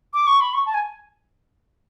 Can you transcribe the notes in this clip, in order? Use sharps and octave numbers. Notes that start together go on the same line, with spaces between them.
D6
C#6
B5
C#6
A5
G#5